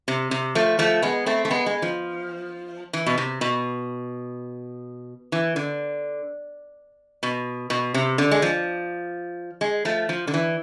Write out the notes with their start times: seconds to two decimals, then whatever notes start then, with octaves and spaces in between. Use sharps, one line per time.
0.08 C3
0.31 C3
0.55 F3 A3
0.79 F3 A3
1.02 G#3 B3
1.26 A3 C4
1.45 A3
1.51 G#3 B3
1.66 G#3
1.82 F3
2.93 E3
3.06 B2
3.18 C3
3.41 B2
5.32 E3
5.56 D3
7.23 B2
7.70 B2
7.94 C3
8.18 D3
8.31 G#3
8.42 F3
9.61 G#3
9.85 F3 A3
10.09 F3
10.27 D3
10.34 E3